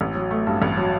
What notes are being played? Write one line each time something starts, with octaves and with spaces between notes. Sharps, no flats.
A1
F#3
A3
G2
A1
F#3